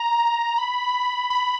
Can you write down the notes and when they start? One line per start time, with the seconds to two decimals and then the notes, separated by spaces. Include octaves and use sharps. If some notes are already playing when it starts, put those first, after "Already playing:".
Already playing: A#5
0.58 B5
1.30 B5